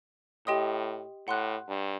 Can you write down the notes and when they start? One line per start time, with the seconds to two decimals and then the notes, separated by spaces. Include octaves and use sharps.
0.47 A2 G4 D#5 G5 C6 D#6
1.28 A2 F#5 C6 F#6
1.69 G2